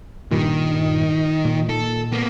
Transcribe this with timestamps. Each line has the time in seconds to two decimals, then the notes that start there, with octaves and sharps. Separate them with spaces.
0.31 G2 A#2 D#3
1.45 A#2
1.69 A4
2.12 A#3 B3